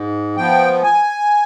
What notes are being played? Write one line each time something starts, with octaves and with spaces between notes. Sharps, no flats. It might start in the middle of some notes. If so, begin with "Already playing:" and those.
Already playing: G#2
F3 B3 G5
G#5